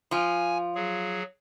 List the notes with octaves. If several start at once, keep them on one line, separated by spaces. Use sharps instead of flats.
F3 F4 G#5
F#3 G#4